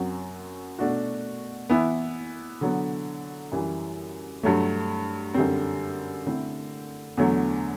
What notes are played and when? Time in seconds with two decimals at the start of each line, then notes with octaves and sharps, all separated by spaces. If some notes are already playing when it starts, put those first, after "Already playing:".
Already playing: F#2 F#3 C4 F#4
0.79 B2 A3 D4 F#4
1.70 E3 B3 E4
2.61 D3 F#3 B3
3.52 F#2 E3 G3
4.43 G2 F#3 A3
5.34 F#2 D3 G3 C4
6.26 D3 A3 C4 E4
7.17 E2 D3 F#3 A3